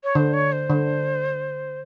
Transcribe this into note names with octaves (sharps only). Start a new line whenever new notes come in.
C#5
D3 C5
C#5
C5
D3